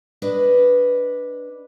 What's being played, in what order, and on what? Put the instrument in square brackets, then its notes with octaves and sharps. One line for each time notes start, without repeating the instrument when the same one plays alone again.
[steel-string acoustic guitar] D4 B4 D#5